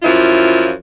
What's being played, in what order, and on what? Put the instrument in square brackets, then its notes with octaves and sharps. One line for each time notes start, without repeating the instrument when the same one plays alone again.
[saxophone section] F#2 F3 E4 F4